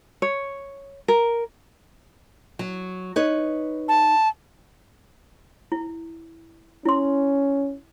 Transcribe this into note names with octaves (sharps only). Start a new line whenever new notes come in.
C#5
A#4
F#3
D#4 B4 C#5
A5
E4
C#4 E4 C6